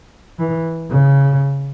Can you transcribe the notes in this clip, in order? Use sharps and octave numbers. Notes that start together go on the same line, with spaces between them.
E3
C#3